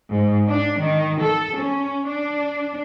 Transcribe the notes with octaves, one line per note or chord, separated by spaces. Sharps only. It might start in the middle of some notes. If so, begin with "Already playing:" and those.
G#2
D4
D#3
A4
C#4
D4